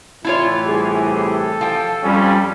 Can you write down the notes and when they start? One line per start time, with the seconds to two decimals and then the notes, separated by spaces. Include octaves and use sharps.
0.25 A2 E3 E4 F4 C#5
0.65 C2 G4 G#4
1.14 A4
1.61 F3 G5
2.03 F2 G3 C#4